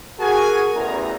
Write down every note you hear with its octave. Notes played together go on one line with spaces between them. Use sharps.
F#4 G#4 A#4 G#5
A1 E2 A#5